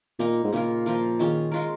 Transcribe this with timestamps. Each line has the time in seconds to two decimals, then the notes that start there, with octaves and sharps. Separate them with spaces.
0.19 A#2 A#3 D#4 A#4
0.44 G#2
0.53 A#2 C#3 A#3 F4 A#4
0.86 F3 A#3 F4 A#4
1.19 D#3 C#4 F4 G#4
1.52 G#3 F4 A#4